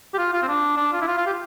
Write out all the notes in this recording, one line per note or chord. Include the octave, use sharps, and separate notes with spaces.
G4
F4
F4
C4
D4
D4
F4
E4
F4
F4
G4